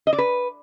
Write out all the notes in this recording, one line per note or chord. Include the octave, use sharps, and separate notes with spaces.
D#5
D5
B4